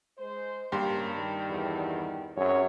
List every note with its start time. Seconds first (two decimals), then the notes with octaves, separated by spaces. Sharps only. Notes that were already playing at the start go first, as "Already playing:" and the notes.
0.18 G#3 C5
0.72 G2 C#3 A#3 G4 C6
1.15 D#3 G3
1.49 E2
2.37 F#2 C4 G#4 C#5